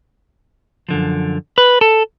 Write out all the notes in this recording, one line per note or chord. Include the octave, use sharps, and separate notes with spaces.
F#2 D3 F3
B4
A4